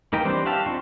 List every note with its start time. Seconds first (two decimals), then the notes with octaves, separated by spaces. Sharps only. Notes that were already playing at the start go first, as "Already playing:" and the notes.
0.13 A#3 D#4 A#4 B4 G5
0.25 E3 G3 C4 D4 C5
0.45 F#4 G4 E5 F5 A5
0.66 C4 D4 D#4 F4 C#6